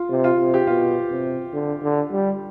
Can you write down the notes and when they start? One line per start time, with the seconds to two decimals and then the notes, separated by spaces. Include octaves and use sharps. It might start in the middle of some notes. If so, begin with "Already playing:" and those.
Already playing: F4
0.10 C3
0.24 F4
0.39 C3
0.54 G4
0.67 B2 F4
1.11 C3
1.53 D3
1.82 D3
2.11 G3